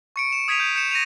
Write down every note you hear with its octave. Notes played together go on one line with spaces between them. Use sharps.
C#6 C#7 D7
E7
D#6 G#6 B6 D#7 F7
G6
G6 C#7 E7
A#6 D#7 F7